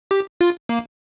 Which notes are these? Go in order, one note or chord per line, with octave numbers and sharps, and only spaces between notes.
G4
F4
A#3